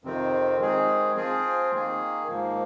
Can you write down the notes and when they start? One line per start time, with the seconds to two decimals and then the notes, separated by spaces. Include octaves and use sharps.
0.04 F2 C3 D#3 C4
0.59 D#3 G#3 C4 G#4
1.16 F3 C4 F4 G#4
1.73 D#3 A#3 G#4
2.27 G#2 F3 A#3